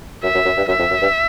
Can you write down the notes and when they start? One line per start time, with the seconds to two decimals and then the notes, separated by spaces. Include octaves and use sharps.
0.23 F#2 E5
0.35 F#2
0.45 F#2
0.57 G2
0.68 F#2 E5
0.80 F2
0.90 F#2
1.02 G2